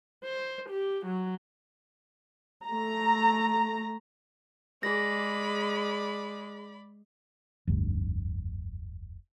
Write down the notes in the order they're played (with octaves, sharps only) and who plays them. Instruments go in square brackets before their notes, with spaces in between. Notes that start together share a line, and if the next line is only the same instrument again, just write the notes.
[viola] C5
G4
F#3
[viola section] A3 A#5
[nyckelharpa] G#3 [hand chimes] G#4 A#6 [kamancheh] D5 B5
[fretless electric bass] F1 D2 G2